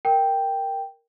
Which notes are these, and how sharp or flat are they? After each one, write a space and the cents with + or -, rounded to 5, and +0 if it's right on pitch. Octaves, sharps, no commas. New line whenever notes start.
A#4 +0 G5 +0